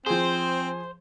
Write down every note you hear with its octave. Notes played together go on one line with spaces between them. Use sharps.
F3 C4 G#4 C5